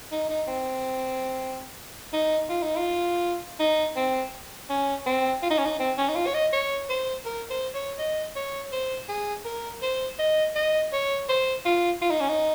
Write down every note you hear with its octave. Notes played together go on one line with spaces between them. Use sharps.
D#4
D#4
C4
D#4
F4
D#4
F4
D#4
C4
C#4
C4
F4
D#4
C#4
D#4
C4
C#4
D#4
F4
C#5
D#5
C#5
C5
A#4
C5
C#5
D#5
C#5
C5
G#4
A#4
C5
D#5
D#5
C#5
C5
F4
F4
D#4
C#4
D#4